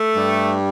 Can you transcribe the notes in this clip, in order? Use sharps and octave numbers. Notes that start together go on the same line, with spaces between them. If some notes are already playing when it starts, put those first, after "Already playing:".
Already playing: A3
G2 G3